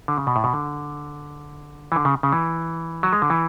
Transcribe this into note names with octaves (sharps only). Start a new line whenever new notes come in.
D3
C#3
B2
A2
B2
D3
E3
D3
C#3
C#3
E3
F#3
G#3
D3
E3